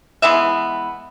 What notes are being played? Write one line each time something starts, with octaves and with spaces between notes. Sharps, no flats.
E3 G#3 B3 E5